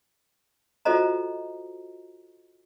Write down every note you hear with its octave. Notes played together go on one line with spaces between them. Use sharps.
F4 F#4 A4 C5 D#5 A#5